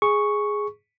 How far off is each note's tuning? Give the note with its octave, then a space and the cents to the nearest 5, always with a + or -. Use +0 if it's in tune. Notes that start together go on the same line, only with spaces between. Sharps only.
G#4 +0 C#6 +0